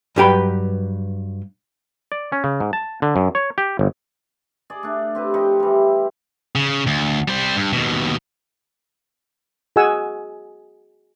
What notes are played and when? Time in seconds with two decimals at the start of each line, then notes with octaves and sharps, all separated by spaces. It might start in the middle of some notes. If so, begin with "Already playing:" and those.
0.16 G2 F#3 G4 B4 G5 B5
2.12 D5
2.32 C#4
2.44 C#3
2.60 G#2
2.73 A5
3.02 D3
3.16 F#2
3.35 C#5
3.58 G4
3.79 G1
4.70 G#4 D5
4.83 A3 D4
5.15 C4 G4 B4
5.34 F3 D#4 G4
5.60 E3 G3
6.55 C#3
6.87 D2
7.28 G3 C5
7.56 G2
7.73 D#2 B2
9.76 F#4 G#4 D#5 F#5 G#5 E6